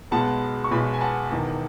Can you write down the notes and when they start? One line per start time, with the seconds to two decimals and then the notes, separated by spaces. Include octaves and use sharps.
0.11 B1 B2 G#3 B3 F#5 A5
0.64 C#6
0.71 B1 B2 G#3 B3 G#5 B5
0.94 G#5
1.00 F#5 A5
1.31 E1 E2 D#3